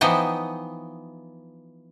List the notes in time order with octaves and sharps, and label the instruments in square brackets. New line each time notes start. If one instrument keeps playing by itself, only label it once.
[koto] E3 F3 B3 D#4 D#5 G5